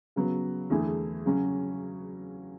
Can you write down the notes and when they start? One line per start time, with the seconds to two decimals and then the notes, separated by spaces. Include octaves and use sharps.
0.16 C#3 F#3 B3
0.70 E2 D3 A3 E4 G#4
1.26 C#3 F#3 C#4 F#4